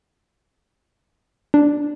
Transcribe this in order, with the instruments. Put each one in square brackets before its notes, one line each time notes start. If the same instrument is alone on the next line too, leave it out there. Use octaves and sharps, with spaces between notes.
[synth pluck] D4